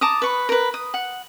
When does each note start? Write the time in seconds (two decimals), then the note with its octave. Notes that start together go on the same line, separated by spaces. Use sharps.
0.01 A5 A#5 D6 D#6
0.22 B4 C#6
0.49 A#4 B4
0.74 D#6
0.94 F#5